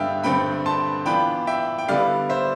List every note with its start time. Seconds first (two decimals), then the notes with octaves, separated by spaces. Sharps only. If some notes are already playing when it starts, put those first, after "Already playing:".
Already playing: G2 D3 G3 B3 E5 F5 G5
0.24 G2 D3 A3 C4 G5 B5
0.66 A5 C6
1.06 E3 B3 D4 F4 G5 B5
1.47 E5 G5
1.78 G5
1.88 D3 G3 B3 E4 D5 F5
2.29 C5 E5